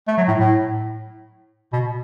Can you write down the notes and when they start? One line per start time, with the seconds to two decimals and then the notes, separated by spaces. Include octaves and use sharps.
0.08 A3
0.18 F#3
0.28 A2
0.38 A2
1.73 B2